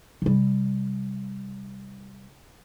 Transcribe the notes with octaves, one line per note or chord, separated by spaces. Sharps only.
C3 G3